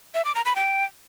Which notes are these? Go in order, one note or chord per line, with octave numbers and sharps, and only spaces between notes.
E5
D6
A#5
B5
G5